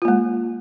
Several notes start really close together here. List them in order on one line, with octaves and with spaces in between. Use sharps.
F4 A#3 G#3